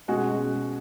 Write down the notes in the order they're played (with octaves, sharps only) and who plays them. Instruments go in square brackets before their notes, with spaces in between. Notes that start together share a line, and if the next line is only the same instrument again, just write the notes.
[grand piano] B2 G#3 C#4 F#4